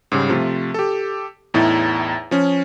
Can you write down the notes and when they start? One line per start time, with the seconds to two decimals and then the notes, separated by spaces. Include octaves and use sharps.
0.12 G#2 C#3 G3
0.29 C3 F3 A3 F4
0.74 G4 A4
1.54 E2 A2 D#4 E4
2.31 F3 C#4